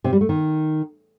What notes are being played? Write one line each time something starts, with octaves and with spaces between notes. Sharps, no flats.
C3
G3
A3
D#3